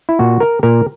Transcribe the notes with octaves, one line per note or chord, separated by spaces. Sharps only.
E4
A#2 F#4
A#4
A#2 A#4